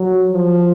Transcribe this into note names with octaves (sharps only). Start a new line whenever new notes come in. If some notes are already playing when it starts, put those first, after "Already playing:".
Already playing: F#3
F3